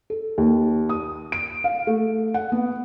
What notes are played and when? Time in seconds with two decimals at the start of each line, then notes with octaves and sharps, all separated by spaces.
0.10 A4
0.38 D#2
0.89 D#6
1.32 D7
1.64 F5
1.87 A3
2.34 F#5
2.52 B3